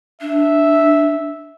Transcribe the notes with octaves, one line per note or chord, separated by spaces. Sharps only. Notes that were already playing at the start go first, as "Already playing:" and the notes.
D4 E5